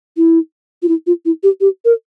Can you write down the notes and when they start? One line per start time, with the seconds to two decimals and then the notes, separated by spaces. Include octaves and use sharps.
0.17 E4
0.82 F4
0.88 E4
1.07 F4
1.25 E4
1.43 G4
1.61 G4
1.85 A#4